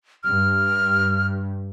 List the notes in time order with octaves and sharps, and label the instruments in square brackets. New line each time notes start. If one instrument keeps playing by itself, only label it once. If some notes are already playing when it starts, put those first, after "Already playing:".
[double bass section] G2 [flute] F6